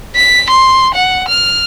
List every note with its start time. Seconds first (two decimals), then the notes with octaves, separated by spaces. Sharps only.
0.16 B6
0.50 C6
0.94 F#5
1.28 F6